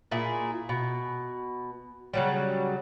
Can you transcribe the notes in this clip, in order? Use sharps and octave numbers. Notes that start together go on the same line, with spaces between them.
A#2 E4 G#4
B2
C#3 F#3 G3